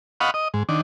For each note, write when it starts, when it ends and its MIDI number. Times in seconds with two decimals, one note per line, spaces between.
0.20 0.31 75
0.20 0.31 77
0.20 0.31 78
0.20 0.31 83
0.20 0.31 85
0.34 0.48 75
0.54 0.63 44
0.69 0.81 51
0.69 0.81 62